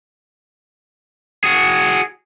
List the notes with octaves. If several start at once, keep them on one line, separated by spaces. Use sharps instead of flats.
F#4 G#4